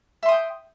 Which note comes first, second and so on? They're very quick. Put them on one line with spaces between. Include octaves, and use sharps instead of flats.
E5 C6 D#6 G5